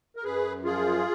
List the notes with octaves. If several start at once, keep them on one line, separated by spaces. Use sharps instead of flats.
A#4
F#2 G#4 B4
F3 F4 G#4